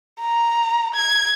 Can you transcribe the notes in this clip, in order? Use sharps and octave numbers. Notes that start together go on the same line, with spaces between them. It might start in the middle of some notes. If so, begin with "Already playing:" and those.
A#5
G#6